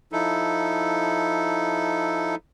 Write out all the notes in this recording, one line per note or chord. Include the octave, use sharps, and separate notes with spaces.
F3 D#4 E4 A4